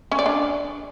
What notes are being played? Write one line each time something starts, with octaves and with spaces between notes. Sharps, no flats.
C#4
D5
D4